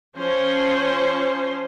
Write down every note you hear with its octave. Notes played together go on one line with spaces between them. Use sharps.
F3 C#4 C5